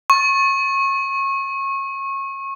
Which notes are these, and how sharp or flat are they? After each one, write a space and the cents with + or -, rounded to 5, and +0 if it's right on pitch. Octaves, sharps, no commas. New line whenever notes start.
C#6 -25